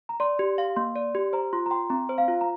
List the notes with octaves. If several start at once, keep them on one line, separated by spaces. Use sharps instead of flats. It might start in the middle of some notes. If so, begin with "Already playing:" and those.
A#5
D5 C6
G4
F5
A#3 C6
D5
G4
C5 A#5
F4 C6
A#5
G5 C6
C4 A#5
C5
F5
F4
A#5